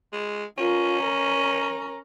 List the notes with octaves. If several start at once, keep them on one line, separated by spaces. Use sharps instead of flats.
G#3
C#4 F4 A#4
A#4 A#5